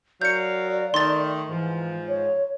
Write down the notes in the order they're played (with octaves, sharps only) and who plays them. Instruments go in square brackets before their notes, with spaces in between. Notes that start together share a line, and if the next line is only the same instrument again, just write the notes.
[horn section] F#3 A#4 F5 [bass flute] D5 [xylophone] G6 C#7
[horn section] D#3 A3 [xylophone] C6 A6
[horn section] G#2 F3 [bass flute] E3
[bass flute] C#5